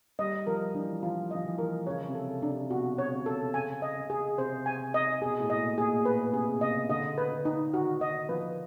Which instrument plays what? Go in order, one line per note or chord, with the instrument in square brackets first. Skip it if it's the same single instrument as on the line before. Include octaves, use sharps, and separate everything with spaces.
[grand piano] G3 [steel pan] D#5
[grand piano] F3 [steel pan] A#4
[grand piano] E3 [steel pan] D4
[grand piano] F3 [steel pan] F4
[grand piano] F3 [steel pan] D#5
[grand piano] E3
[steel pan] A#4
[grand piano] C#3 [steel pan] C#5
[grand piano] C3
[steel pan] A4
D4
[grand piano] C3
[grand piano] B2 [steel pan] F#4
[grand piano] C#3 [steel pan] C#5
[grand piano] C3
[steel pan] A4
[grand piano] C#3 [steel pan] G#5
[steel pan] D#5
[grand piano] C#3
[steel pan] G#4
[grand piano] C3 [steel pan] C5
[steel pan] G#5
D#5
[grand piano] B2 [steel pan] G#4
[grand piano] A2
[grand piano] A#2 [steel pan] D#5
[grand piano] A#2 [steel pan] G#4
[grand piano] B2 [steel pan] B4
[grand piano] C3 [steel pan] G#4
[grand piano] C#3 [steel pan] D#5
[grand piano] D3 [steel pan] D#5
[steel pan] B4
[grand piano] D3
[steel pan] D#4
[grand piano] D#3 [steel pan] F#4
[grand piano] D#3 [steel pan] D#5
[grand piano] F3 [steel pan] B4